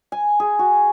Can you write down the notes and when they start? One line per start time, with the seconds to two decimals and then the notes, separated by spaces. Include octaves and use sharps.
0.12 G#5
0.40 G#4
0.59 F#4